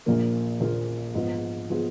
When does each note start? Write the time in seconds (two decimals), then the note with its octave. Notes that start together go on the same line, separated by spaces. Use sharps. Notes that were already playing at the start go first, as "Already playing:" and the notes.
0.06 A#1 A#2 F3 A#3
0.60 A#1 A#2 F3 A#3
1.14 G#2 F3 B3 F4 G#4
1.70 F3 B3 F4 G#4